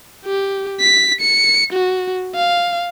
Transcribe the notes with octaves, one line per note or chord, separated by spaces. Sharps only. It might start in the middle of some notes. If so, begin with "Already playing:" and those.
G4
B6
C#7
F#4
F5